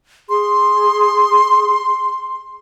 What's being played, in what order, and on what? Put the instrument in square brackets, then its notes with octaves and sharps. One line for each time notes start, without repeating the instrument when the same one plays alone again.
[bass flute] G#4 [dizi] C6